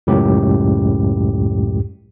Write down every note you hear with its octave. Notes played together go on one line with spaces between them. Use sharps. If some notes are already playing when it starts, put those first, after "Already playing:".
C#2 F#2 A2 G4